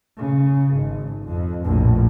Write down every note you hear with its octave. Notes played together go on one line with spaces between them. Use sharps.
C#3
G#1
F2
A#1 A2